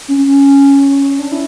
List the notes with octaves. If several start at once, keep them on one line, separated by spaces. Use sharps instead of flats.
C#4
D4
E4